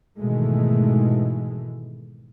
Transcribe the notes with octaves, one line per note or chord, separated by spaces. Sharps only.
G#2 B2 D#3 E3 G#3 A3